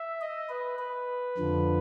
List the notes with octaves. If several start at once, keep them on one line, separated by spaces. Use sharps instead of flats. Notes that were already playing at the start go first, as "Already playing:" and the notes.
Already playing: E5
D#5
B4
B4
F2 D3 F3